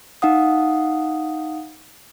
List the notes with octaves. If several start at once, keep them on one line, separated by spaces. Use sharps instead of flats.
D#4 F5 F#5 D#6